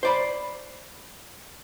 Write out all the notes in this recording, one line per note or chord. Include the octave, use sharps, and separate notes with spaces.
C5 D5 B5